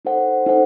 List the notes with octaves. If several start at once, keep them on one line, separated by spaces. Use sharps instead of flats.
D#4 A4 C5 F#5
D#4 A4 C5 F#5